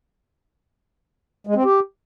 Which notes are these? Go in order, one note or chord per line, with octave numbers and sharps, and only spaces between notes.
G#3
C4
G4